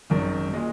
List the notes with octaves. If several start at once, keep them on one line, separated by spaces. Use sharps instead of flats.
G#1 F#2 D#3
A#2 G#3